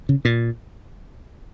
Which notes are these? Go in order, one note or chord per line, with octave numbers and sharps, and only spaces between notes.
C#3
A#2